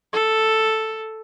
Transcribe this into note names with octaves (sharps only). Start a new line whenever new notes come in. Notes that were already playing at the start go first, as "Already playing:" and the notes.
A4